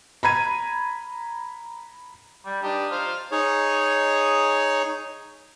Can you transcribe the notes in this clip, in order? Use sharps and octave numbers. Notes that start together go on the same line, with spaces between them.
A#5 B5 G#6 D#7
G3
D4 D#4 G4
C5 F5
D#4 G#4 C#5